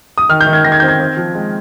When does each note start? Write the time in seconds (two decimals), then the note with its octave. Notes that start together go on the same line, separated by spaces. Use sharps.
0.18 D#6
0.29 D#3 F6
0.41 G6
0.47 D#3
0.53 G#6
0.64 D#3 A#6
0.72 G#6
0.80 C4 G6
0.88 G#6
1.00 C4
1.17 F3
1.35 G#3